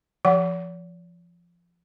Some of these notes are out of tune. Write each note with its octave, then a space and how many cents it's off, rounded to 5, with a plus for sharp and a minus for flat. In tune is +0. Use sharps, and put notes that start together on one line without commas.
F3 -15 F#5 +0